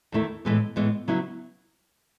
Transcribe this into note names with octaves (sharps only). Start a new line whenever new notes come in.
E2 D#3 A3 E4
A2 E3 G#3 B3
A2 E3 G#3 B3
C#3 F#3 B3 E4